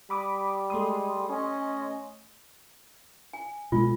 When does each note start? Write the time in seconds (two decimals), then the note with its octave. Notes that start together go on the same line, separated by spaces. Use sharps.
0.10 G3 B5 D6 D#6
0.70 G#3 A3 C6 D#6
1.29 C#4 D#5
3.33 G#5
3.72 B2 G#3 A3 F4